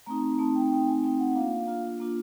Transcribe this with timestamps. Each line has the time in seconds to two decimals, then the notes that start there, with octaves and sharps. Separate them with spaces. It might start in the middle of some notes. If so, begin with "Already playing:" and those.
0.06 A3 C4 D#4 A#5
0.39 A3 C4 D#4 A5
0.55 G5
0.71 A3 C4 D#4 G5
0.87 G#5
1.03 A3 C4 D#4 G5
1.19 F#5
1.35 A#3 D4 F4 F5
1.67 A#3 D4 F4
2.00 A#3 D4 F4